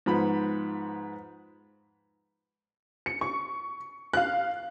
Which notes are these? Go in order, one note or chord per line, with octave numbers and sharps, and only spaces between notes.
G#2 F3 B3 B5
C#7
C#6
F5 F#6